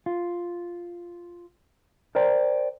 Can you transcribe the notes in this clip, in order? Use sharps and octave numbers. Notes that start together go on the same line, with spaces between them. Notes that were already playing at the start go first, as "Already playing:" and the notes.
F4
A#4 C5 D5 G5 A#5